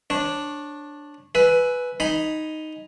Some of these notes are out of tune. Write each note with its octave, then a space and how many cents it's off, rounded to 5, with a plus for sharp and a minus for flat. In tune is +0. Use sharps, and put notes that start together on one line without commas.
D4 +0 C#5 -20
B4 +0 E5 +0 G#5 +20
D#4 +0 G#5 +0 B5 +0